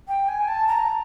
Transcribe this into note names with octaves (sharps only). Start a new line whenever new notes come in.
G5
G#5
A5
A#5